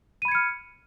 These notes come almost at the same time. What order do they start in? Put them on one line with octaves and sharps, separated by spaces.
D#7 B5 G#6 C#7 F6